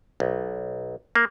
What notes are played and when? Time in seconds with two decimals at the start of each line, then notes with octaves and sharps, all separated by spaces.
0.20 B1
1.15 A#3